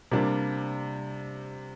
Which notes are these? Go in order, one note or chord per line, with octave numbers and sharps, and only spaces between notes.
C3 G3 A#3 D4